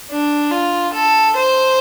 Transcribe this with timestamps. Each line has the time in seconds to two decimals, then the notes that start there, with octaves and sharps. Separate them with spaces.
0.10 D4
0.51 F4
0.93 A4
1.36 C5